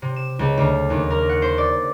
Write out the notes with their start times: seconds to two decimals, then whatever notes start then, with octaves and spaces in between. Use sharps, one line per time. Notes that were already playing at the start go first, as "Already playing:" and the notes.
0.02 C3
0.16 E7
0.39 C#2
0.57 D2
0.90 D#2
1.10 A#4
1.29 F#5
1.42 C5
1.58 D5